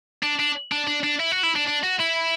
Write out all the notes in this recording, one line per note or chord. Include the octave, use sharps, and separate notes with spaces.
D4
D4
D4
D4
D4
E4
F#4
E4
D4
D4
F#4
E4